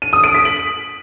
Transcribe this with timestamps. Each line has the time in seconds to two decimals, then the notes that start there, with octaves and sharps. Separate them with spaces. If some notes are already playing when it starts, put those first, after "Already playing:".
0.02 D#7
0.13 D#6
0.24 D7
0.34 B6
0.45 F#7